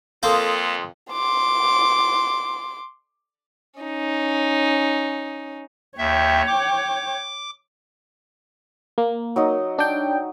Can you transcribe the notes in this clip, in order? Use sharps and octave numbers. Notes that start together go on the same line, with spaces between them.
F2 A#3 A4 F5 G5 C6 D#6
C6 D6
C#4 D#4
D#2 C#5 E5 G5
D6
A#3
F#3 D#4 D#6
D4 G5